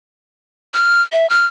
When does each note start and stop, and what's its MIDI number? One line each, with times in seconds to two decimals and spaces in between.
0.74 1.02 89
1.12 1.28 76
1.30 1.46 89